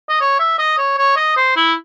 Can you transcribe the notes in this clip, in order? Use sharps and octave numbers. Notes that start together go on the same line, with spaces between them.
D#5
C#5
E5
D#5
C#5
C#5
D#5
C5
E4